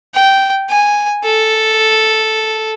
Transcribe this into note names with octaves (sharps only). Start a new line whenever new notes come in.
G5
G#5
A4